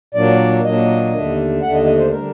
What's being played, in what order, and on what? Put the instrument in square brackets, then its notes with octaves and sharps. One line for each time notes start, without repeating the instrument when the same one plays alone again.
[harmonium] A#2 F#3 A#3 D4 D5
A#2 F#3 A#3 D4 D#5
D#2 D3 A3 D4
D#2 D3 A3 D4 F#5
D#5
D#5
C5
D3 G3 D4 A#4